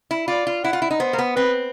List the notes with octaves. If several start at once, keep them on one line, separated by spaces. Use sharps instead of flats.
E4
F4 D5
F4
E4 F#5
F4
E4
D#4
B3 C5
A#3
B3
C4 B4